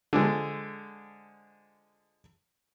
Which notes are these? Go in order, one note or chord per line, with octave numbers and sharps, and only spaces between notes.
D3 F3 G#3